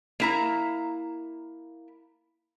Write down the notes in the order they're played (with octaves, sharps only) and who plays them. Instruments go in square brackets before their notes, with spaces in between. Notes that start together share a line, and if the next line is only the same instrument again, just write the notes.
[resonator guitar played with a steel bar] A#3 E4 A#5